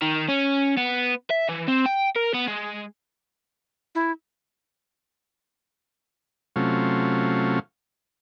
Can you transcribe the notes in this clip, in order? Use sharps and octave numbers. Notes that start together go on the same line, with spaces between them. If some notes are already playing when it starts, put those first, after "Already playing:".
D#3
C#4
B3
E5
E3
C4
G5
A#4
B3
G#3
E4
C3 F#3 A3 C#4 F4